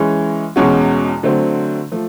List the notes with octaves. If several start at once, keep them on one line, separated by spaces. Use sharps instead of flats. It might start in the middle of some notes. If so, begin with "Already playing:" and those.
Already playing: E3 G#3 C#4
E2 B2 G#3 C#4 F#4
D3 F#3 A3 C4
F3 A3